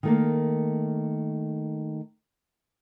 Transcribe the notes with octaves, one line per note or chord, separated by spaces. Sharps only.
D#3 A3 A#3